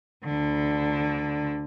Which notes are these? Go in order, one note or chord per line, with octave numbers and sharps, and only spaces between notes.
D2 D3